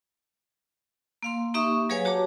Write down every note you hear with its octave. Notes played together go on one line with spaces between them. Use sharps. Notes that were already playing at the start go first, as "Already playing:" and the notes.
A#3 F5 C6
A#3 D#4 G4 E5 C#6 D#6
F#3 G#4 B4 C#5 F5 G#5
F#4 G4 C#5 A5 A#5 D6